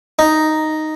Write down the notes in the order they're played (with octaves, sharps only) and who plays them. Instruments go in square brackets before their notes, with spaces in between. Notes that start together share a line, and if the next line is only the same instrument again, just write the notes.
[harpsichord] D#4